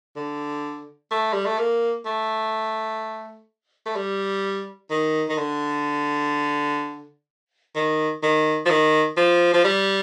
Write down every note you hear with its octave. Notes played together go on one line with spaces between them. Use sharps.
D3
A3
G3
A3
A#3
A3
A3
G3
D#3
D#3
D3
D#3
D#3
F3
D#3
F3
F3
G3